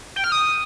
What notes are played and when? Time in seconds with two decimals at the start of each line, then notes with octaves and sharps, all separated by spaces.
0.16 G5
0.24 F6
0.32 D#6